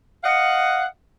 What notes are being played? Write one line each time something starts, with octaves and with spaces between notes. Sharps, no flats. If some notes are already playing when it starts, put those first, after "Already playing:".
D#5 F5 F#5